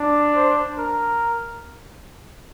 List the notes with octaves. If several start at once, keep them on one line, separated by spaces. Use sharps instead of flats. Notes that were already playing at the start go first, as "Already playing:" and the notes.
Already playing: D4
C5
A#4